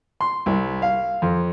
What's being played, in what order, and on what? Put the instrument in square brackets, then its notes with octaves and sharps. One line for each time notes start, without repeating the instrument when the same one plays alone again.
[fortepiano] C6
C2
F5
F2